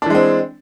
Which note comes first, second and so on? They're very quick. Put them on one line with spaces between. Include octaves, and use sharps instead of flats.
D4 E3 G#3 C4